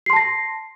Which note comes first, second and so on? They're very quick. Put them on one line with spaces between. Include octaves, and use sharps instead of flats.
C7 C6 A5 A#6